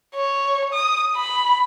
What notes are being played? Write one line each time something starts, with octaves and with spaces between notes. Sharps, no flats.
C#5
D#6
B5